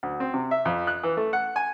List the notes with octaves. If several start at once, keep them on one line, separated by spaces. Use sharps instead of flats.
D2
C4
C3
E5
F2
F#6
E3
A3
F#5
G#5